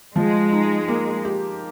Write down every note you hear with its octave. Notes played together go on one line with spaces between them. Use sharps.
F3 G#3
D#4
A#3
G4